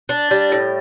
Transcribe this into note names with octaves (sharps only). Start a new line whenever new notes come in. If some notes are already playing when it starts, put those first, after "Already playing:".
D4
G3
A2